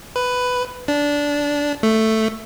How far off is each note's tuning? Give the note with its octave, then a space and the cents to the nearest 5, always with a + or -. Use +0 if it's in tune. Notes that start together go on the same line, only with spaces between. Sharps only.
B4 +10
D4 -15
A3 +5